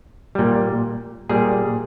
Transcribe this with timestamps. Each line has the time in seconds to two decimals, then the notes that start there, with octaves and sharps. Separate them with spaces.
0.35 A#2 G3
1.29 A#2 G3 G#4